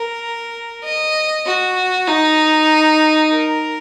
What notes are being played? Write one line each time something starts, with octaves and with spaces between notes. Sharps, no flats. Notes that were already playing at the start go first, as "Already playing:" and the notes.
Already playing: A#4
D#5
F#4
D#4
A#4